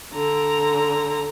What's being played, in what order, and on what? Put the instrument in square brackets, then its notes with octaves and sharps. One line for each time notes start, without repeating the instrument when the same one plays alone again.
[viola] D3 A#5